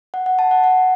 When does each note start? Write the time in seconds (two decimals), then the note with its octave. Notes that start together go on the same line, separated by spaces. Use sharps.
0.14 F#5
0.26 F#5
0.39 A5
0.51 F#5
0.64 F#5